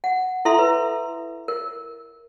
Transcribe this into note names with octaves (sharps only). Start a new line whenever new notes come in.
F#5
E4 A4 E5 A#5 C6
B4
A#4